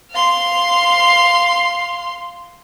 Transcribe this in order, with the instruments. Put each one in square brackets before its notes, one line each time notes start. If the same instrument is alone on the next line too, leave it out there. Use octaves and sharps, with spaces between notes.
[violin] F5 C6